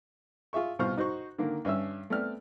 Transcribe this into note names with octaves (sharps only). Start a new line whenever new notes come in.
F4 G#4 E5 C#6
C2 B2 F4 C5 C#6 F6
D#4 F#4 C5 C#6
D3 D#3 A#3
G2 C#4 E5 E6
A3 B3 C4 D5 F6